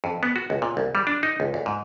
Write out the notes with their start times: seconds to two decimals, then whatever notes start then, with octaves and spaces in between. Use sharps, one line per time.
0.04 F2
0.23 B3
0.36 F#4
0.50 C#2
0.62 A#2
0.77 C2
0.95 G3
1.07 D4
1.23 D#4
1.40 C#2
1.54 D2
1.66 G#2